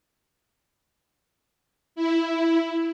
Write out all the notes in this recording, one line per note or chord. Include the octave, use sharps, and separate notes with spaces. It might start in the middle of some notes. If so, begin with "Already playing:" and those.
E4